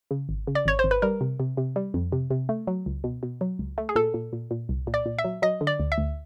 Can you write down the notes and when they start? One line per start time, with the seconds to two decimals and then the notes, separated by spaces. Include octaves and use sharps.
0.11 C#3
0.29 G#1
0.47 C#3
0.55 D5
0.66 G#1 C#5
0.79 C5
0.84 G#1
0.91 B4
1.02 G3 A#4
1.21 C3
1.40 C3
1.57 C3
1.76 G3
1.94 F2
2.12 C3
2.30 C3
2.49 A3
2.67 F#3
2.86 C#2
3.04 B2
3.23 B2
3.41 F#3
3.59 C#2
3.78 A3
3.89 G#4
3.96 A#2 A4
4.14 A#2
4.33 A#2
4.51 A#2
4.69 C2
4.87 A#2
4.94 D5
5.06 A#2
5.19 E5
5.24 F#3
5.42 F#3 D#5
5.61 D3
5.67 D5
5.80 D2
5.92 E5
5.98 D2